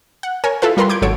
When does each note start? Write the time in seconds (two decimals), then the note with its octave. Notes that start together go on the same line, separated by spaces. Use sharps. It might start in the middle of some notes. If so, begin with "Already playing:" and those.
0.23 F#5
0.44 A#4 C#5 G#5
0.62 E4 F4 A4 B4 F5
0.77 G3 F4 A#4 B4 C6
0.89 D6 G6 G#6 D7
1.02 G#1 F#3 A4 C#5 D7